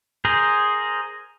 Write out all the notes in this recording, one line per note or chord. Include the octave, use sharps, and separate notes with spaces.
G#4 A#4 C5